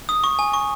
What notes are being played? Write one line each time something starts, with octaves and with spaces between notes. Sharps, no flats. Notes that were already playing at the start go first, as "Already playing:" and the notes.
D#6
C#6
G#5
C#6